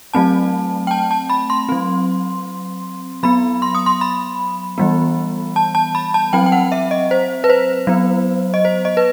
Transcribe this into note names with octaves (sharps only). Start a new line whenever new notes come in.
F#3 A3 C4 A5
G5
A5
A5
B5
C6
F#3 C4
F#3 B3 B5
C6
D#6
C6
B5
E3 G3 B3
A5
A5
B5
A5
F#3 C4 G5
G5
F#5
E5
D#5
C5
B4
C5
F#3 B3
D#5
C5
D#5
B4